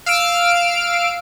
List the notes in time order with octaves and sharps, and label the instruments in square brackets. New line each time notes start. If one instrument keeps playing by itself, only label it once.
[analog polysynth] F5 E6 F6 D7